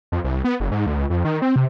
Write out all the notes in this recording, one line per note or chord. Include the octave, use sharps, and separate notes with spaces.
F2
C2
B3
F#1
G#2
D2
C#2
F2
D#3
C4
C3